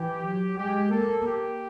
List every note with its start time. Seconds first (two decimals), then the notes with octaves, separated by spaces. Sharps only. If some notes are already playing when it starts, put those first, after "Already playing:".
Already playing: E3 G4
0.24 F#3
0.57 G#3 G4
0.92 A#3 A4
1.26 G4